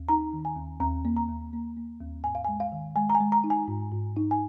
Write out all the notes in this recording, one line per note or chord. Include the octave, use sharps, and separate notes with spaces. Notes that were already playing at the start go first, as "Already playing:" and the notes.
Already playing: D#2
D#4 A#5
D#3
G#5
D#2
D#2 A#5
A#3
A#5
D#2
A#3
A#3
D#2
G#2 G#5
F5
G#5
G#3
F5
D#3
G#3 G#5
A#5
G#5
G#3
A#5
D#4
G#5
G#2
G#2
D#4
G#5